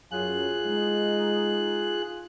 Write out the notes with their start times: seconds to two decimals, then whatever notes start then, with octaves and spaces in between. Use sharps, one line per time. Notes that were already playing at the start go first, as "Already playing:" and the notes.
0.12 F#2 F#3 F4 G#4 F#6
0.65 G#3 D#4